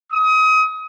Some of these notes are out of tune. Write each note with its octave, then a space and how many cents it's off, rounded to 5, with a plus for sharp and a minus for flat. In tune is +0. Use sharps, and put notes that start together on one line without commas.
D#6 +30